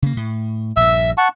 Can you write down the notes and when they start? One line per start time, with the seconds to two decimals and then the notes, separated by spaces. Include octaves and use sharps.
0.02 C#3 A#3
0.17 A2
0.77 A#1 G2 E5 E6
1.18 F#5 A5 C#6